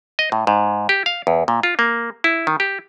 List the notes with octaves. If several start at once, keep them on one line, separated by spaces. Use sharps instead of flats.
D#5
A2
G#2
G4
F5
E2
A#2
F4
A#3
E4
D#3
G4